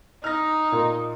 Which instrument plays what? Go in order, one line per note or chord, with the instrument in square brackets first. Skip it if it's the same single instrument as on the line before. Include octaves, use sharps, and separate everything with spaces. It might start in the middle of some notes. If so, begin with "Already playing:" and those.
[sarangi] D#4 [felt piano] F6 A#6
[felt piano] A#2